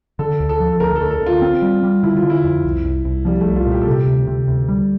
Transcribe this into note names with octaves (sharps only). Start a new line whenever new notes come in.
D3 A4
D2
A4
F3
A4
D2 A#4
A4
D2
A4
D2
F4
C4
G3
G3
D3 E4
F4
D3
E4
F2
C2
C2
C2
F3 G3
C2 A3
F4
A#2
G4
A4
C3 G4
D2
C3
D2
G3